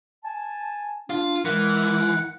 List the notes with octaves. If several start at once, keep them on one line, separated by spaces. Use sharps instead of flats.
G#5 A5
D4 F4
E3 G#3 A#4 F#5 F#6